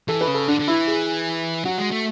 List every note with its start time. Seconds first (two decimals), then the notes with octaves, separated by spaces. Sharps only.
0.08 E3 A4
0.21 B4
0.27 C#3
0.34 A4
0.48 D3 D4
0.60 D3
0.68 E3 E4
0.87 G#4
1.65 F#3 F#4
1.78 G#3
1.91 A3